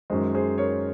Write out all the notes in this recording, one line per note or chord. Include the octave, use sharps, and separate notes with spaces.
F#2 D#3 G#3 G#4 C5
G#4 C5
A#4 C#5